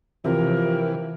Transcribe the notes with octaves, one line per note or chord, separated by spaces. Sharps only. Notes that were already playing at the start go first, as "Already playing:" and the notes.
C3 E3 F3 A#4